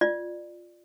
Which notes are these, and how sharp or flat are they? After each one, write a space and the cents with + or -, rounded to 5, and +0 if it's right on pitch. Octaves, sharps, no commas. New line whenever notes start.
F4 +0 D5 +20